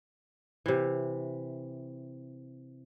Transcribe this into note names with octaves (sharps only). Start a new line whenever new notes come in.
C3 E3